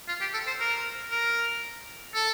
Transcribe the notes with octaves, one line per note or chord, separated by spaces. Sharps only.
F4
G4
A4
C5
A#4
A#4
A4